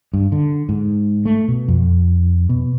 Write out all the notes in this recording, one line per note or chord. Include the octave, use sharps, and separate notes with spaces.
G2
D3
G#2
A3
B2
F2
B2